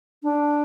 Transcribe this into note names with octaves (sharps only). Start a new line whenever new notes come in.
D4